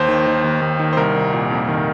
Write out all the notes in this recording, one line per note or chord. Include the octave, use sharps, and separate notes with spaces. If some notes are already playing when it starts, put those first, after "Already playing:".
Already playing: D#2 C5
D#3
D#3
D#2
D#2
D#3
C5
C2 A#4
C2
A#2
F2
D#3